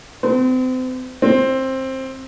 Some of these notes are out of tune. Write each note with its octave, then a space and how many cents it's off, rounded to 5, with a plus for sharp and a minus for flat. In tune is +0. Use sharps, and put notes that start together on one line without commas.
C4 -35
C4 +15